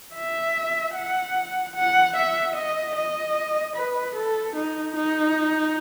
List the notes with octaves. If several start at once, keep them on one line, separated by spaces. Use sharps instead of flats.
E5
F#5
F#5
E5
D#5
D#5
B4
A4
D#4
D#4